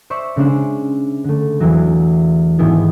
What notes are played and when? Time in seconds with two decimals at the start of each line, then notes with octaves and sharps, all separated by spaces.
0.10 C5 D5 E5 C#6 G6 B6
0.36 C#3 G#3 C#4 D4 C5
1.24 D3 A3
1.60 E2 E3 F#3
2.58 G#2 D#3 E3 B3 E4